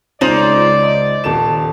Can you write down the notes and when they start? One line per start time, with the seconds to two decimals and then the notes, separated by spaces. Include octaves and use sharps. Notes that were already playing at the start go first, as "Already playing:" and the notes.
0.21 C#2 C#4 D#4 F4 C5 D5 F#7
0.83 D#5
1.24 D#1 A4 E7